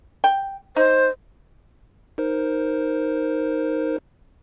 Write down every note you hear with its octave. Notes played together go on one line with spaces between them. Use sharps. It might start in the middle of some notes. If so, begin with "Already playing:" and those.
G5
D#4 C5
D#4 A#4 C5